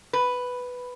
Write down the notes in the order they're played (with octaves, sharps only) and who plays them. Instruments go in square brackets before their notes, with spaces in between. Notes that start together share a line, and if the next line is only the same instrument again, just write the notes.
[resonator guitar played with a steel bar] B4